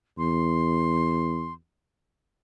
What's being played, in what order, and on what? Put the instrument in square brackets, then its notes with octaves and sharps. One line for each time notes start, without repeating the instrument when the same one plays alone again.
[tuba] E2 [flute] C6